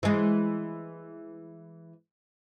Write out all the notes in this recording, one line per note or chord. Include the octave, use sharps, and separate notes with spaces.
E3 G#3